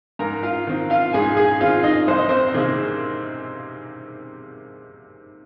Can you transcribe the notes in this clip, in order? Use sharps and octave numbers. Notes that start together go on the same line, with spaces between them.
G#2 A#4 A#5
F4 F5
D#3 C4
F4 F5
G#2 G#4 G#5
G#4 G#5
D#3 C4 F4 F5
D#4 D#5
C2 C5
D#5
C4 C5
C3 D#3 A#3 G#4